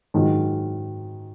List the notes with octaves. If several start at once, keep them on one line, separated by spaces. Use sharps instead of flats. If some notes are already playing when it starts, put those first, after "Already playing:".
G#2 D#3 F#3